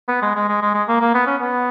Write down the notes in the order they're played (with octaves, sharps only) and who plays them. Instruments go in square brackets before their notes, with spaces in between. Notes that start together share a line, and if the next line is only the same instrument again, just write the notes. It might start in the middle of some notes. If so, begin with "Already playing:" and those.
[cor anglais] B3
G#3
G#3
G#3
G#3
G#3
A#3
A#3
B3
C#4
B3